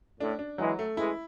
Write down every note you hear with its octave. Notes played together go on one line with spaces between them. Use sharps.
A2 D4
D4
E3 F#3 G#3
A3
E3 G#3 E4